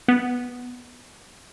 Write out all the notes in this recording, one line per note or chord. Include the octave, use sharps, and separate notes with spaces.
B3